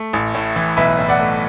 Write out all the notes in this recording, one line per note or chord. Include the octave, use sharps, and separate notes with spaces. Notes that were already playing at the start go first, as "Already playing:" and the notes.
Already playing: A3
A1
A2
E3
B1 B4 E5
A2
D5 F#5
A3